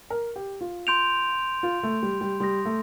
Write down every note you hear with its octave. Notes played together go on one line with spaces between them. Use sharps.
A#4
G4
F4
C6 G6 D7 F7
F4
A3
G3
G3
G3 C6 D#6 A#6
A3